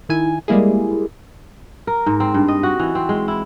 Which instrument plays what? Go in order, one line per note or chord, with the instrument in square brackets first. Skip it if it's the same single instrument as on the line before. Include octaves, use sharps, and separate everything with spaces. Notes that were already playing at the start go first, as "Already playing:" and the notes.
[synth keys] D#3 E4 G#5
G3 G#3 A#3 E4 G#4
[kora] A#4
G#2
C4
G2
D#5
F#4
E3
C4
G#3
E4